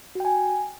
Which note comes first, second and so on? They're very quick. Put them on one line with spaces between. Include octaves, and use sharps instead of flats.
F#4 G5 G#5